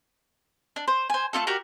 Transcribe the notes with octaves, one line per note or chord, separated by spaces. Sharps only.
D4
C5
C5 G#5
A3 D#4 F4 A4
F#4 G4 A#4 D5